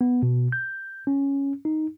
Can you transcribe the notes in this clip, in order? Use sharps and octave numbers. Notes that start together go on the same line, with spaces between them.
B3
B2
G6
C#4
D#4